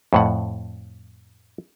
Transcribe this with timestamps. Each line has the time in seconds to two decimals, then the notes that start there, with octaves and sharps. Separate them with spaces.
0.13 F2 A2 F#5